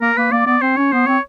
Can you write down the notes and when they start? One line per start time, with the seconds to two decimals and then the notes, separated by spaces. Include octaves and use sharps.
0.01 A#3 A#4
0.17 A#3 B4
0.31 A#3 D5
0.46 B3 D5
0.62 C4 C5
0.77 C#4 C#5
0.92 B3 C5
1.07 C4 C#5